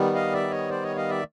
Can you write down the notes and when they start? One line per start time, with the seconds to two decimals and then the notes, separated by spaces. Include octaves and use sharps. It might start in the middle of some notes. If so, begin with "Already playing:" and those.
Already playing: D#3 G3 B3
0.15 D#5 F5
0.33 D5 E5
0.51 C#5 D#5
0.69 C5 D5
0.83 C#5 D#5
0.96 D#5 F5
1.10 D5 E5